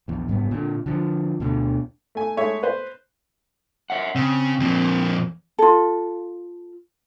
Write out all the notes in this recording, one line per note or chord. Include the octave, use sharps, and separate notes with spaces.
A#1 E2
F#1 G#2 G3 B3
A#2 D3
D3 F3
D2 B2 D3
A3 G#5
G#3 A3 C#5 E5
B4 C5
C#5 E5 F#5
C#3 C4
F2 A#2
F4 A4